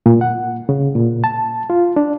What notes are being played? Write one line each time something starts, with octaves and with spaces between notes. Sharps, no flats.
A#2
F#5
C#3
A#2
A5
F4
D4